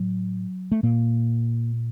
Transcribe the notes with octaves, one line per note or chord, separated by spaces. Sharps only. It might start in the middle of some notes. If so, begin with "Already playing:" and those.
Already playing: A2 F#3
A3
A#2 A#3